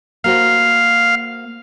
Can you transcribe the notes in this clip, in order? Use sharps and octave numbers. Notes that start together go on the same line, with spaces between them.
A#3 F#4 C5 F5